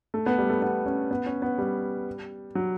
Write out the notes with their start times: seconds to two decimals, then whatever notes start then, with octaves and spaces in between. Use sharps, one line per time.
0.14 A3
0.26 B3
0.38 G3
0.49 A3
0.62 B3
0.86 C#4
1.11 B3
1.26 C#4
1.42 B3
1.58 G3
2.55 F#3